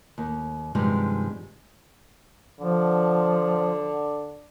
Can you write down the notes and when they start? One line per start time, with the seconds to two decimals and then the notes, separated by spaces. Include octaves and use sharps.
0.18 D#2
0.75 G2 C3 D#3 F3 G3 G#3
2.60 D3 F3